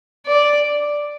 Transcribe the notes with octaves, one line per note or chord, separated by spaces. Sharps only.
D5